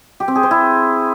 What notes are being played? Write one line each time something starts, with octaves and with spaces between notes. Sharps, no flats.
G4
C4
G#4
C5
E4